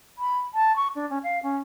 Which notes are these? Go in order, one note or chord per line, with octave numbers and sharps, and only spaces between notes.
B5
A5
C#6
D4
C#4
F5
C#4